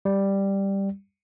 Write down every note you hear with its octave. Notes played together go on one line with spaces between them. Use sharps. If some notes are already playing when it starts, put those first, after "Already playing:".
G3